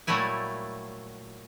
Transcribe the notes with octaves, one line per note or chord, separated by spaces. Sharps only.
A#2 F#3 G3 A3 E4 G#5